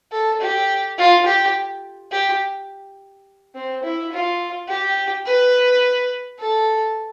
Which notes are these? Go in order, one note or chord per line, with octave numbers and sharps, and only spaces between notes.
A4
G4
F4
G4
G4
C4
E4
F4
G4
B4
A4